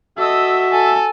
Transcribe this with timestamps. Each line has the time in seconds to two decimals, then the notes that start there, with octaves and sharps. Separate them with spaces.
0.18 F#4 A4 D#5 E5 E6
0.71 A4 G#5